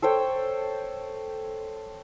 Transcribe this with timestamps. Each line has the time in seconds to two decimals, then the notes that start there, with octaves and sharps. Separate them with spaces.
0.02 A4 C5 C#5 G5